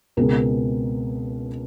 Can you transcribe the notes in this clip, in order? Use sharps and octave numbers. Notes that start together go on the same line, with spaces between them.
C#2 B2 G#3 C4 G#4 A#4